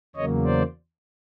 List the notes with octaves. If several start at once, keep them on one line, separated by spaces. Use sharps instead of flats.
E2 C#3 F#3 A#3 C#5 D#5
C5 D5